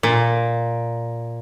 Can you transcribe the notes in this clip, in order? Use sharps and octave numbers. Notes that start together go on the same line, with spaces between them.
A#2